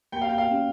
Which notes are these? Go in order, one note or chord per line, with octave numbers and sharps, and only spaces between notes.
A#3 G5
F5
G5
F5
C#4